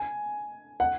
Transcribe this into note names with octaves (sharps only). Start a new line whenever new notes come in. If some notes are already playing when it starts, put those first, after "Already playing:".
Already playing: G#5
F#5